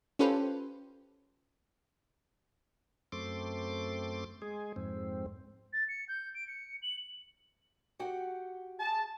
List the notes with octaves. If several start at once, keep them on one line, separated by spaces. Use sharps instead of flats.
C#4 F4 G4 A4 B4 C5
F#2 A3 C4 C6 D6
G#3 G#4
F2 G#2 C4
A6
C#7
G6
D7
C#7
F#7
F#4 G4 F#5
G#4 A5